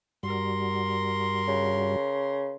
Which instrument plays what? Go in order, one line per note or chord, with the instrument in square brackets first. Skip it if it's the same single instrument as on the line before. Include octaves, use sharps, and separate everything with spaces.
[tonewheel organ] G2 G3 F#4 [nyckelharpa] A#4 C6
[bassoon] C#3